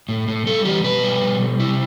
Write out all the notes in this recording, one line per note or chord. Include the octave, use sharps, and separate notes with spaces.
A2
A2
G3 A4
E3 G4
B2 B4
G3
B2
G3
C3 E4